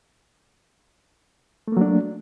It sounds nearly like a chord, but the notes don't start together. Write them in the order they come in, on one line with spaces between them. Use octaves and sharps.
A3 A#3 F#3 D4